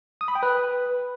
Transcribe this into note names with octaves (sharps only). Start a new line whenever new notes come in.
D#6
B5
G5
B4